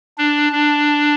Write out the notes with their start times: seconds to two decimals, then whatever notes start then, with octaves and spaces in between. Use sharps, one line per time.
0.18 D4
0.52 D4